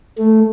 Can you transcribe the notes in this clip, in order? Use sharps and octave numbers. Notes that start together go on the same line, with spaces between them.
A3